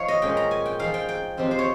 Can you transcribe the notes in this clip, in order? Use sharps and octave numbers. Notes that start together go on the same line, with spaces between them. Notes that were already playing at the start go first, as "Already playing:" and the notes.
Already playing: F3 D#4 C#5 F5
D#5
A#2 G#3 C#4 G5
A#5
G#5
G5
F3 G#3 D#4 F5
G5
G5
C3 F3 C4 D#4
C5
C#5